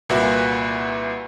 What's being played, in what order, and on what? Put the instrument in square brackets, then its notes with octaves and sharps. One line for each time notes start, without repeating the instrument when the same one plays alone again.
[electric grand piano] C2 A#2 F#4 B4 E5 F#6